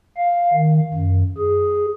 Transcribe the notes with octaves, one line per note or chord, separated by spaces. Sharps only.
F5
D#3
F#2
G#4